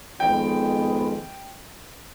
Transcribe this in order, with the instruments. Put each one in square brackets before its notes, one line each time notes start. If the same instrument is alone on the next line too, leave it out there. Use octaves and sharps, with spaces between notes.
[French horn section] F2 D#3 G#3 B3 [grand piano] G5